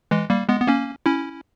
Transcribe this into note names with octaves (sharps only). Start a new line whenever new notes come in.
E3 G#3
G3 A#3
G#3 B3
B3
A#3 C#4
C#4 E4